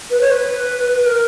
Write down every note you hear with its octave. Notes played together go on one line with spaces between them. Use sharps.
B4
C#5
B4
A#4